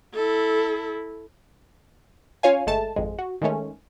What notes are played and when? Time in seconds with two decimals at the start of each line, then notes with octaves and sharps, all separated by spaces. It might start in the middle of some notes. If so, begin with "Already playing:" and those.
0.14 E4 A4
2.43 C#4 F4 C#5 F5 G#5
2.67 G1 G#3 A3 A5
2.96 G#1 F2 G#3
3.19 F#4
3.42 D#3 G#3 A3 C#4